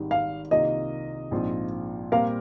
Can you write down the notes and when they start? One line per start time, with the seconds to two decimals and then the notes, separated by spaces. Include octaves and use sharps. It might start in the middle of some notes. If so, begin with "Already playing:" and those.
Already playing: G#1 G#2 D#3 G3
0.11 F5
0.51 C2 C3 D#3 A#3 F4 D#5
1.31 A#1 G#2 F3 C4 F4
2.12 A#2 G3 C4 G4 A#4 F5